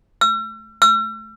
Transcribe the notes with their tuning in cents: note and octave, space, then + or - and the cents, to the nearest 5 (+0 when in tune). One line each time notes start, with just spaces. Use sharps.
E6 +45
E6 +45